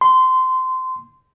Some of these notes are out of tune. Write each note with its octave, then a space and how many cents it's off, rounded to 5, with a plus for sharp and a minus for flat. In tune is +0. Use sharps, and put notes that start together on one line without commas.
C6 -20